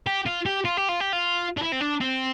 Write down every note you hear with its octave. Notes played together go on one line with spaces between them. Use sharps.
G4
F4
G4
F4
G4
F4
G4
F4
D4
E4
C4
D4
C4